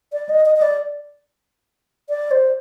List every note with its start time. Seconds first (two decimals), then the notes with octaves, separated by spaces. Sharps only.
0.13 D5
0.29 D#5
0.46 D#5
0.56 D#5
0.62 D5
2.09 D5
2.31 C5